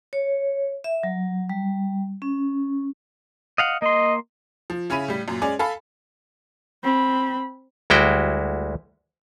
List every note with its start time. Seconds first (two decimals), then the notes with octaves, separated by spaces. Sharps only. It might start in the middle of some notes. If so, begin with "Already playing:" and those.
0.13 C#5
0.84 E5
1.03 F#3
1.50 G3
2.22 C#4
3.58 D#5 F5 F#5
3.82 A#3 D#5 C6
4.70 F3
4.90 C#3 C#4 E4 B5 D#7
5.08 A2 G3
5.28 F#2 A#2
5.42 G#3 C#4 D5 G#5
5.59 A4 F5 G#5 B5
6.84 C4 B5
7.90 D2 G3 G#3 E4 F#4 G5